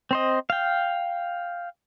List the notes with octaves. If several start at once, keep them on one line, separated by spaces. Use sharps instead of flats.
C4 C5 D#5
F5 G5